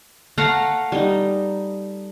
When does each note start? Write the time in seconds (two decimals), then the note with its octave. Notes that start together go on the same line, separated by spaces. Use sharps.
0.38 A3 F5 F#5 A#5
0.92 G3 D#4